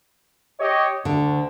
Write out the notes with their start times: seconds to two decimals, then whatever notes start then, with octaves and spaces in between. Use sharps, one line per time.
0.60 G4 C#5 D#5
1.05 D2 D3